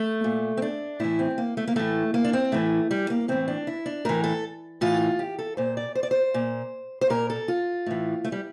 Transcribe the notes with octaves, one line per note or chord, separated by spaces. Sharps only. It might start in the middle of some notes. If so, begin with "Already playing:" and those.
Already playing: A3
A#2
C4
D4
A2 E3 E4
C4
A#3
A3
A#3
A2 E3 A3
A#3
D4
C4
A2 E3 A3
G3
A#3
A2 E3 C4
D4
E4
D4
A2 E3 A#4
A4
A2 E3 F4
G4
A4
A#2 C5
D5
C5
D5
C5
A#2
C5
A#2 A#4
A4
F4
A2 E3
A3
G3